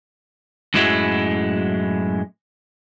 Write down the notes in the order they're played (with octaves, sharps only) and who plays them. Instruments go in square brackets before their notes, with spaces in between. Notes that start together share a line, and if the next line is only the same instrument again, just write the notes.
[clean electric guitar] F#2 A2 F#3 G#3 E4